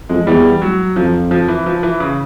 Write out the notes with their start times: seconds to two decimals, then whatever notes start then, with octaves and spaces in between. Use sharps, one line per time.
0.09 F2 G#3
0.27 E2 G3
0.62 F#3
0.96 F2 F3
1.31 F3
1.48 E3
1.66 F3
1.83 E3
2.00 C#3